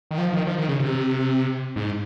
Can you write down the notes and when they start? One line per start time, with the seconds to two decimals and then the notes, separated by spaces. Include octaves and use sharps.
0.11 D#3
0.18 F3
0.33 D#3
0.47 F3
0.58 D#3
0.69 C#3
0.79 C3
1.76 G#2